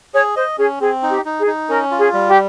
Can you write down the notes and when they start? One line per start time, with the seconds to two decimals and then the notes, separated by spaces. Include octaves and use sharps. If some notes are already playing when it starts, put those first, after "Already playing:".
0.14 G#4 C#5
0.36 C5 D#5
0.58 C#4 G#4
0.80 C4 G#4
1.03 D#4
1.10 G4
1.25 D#4
1.40 G#4
1.47 D#4
1.69 C#4 A#4
1.91 F4
1.99 G#4
2.13 G3
2.28 G4